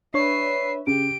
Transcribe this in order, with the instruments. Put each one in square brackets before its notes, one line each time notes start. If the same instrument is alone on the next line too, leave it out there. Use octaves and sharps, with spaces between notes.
[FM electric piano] D4 C#5 [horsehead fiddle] B4 E5 [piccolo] C7
[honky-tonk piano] C#3 [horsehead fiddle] G4 [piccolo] D7